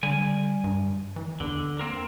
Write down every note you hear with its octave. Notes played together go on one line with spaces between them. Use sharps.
D3 G3 G#5
G2
E3
E2 D3
A#3 C4 A#4